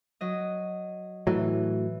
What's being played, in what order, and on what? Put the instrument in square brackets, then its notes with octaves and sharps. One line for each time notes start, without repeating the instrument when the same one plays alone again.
[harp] F#3 D#5
[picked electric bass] A2 F#3 [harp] E3